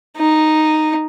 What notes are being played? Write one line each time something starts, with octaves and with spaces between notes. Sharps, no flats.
D#4